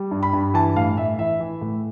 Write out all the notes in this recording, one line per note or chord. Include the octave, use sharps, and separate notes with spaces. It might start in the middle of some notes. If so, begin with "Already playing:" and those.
Already playing: G3
G2
B5
G2
E3 A5
A2 F5
A2 E5
E3 E5
E3
A2